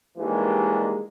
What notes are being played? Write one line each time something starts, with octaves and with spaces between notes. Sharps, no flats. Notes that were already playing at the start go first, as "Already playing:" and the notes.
D#2 E3 G3 G#3 A#3 D4